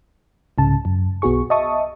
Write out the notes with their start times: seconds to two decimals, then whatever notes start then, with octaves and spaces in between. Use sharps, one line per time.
0.58 C2 G#2 C#3 A5
0.85 F#2
1.22 B1 B3 F#4 G#4 C#6
1.50 D#5 E5 A5 C#6 D#6